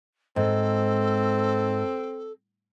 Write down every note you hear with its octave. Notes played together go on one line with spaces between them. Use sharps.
G#2 C4 A4